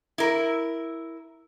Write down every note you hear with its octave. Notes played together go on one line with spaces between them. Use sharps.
E4 A#4